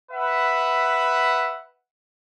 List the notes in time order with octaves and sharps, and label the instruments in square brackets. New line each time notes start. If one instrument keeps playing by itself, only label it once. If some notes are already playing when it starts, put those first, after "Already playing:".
[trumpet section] B4 E5 F#5